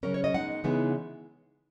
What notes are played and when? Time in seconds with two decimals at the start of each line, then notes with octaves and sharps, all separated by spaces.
0.03 C#3 F#3 C#4 A#4
0.14 C#5
0.24 D#5
0.34 B2 G#3 D#4 F#5
0.64 C#3 E3 G#3 B3 D#4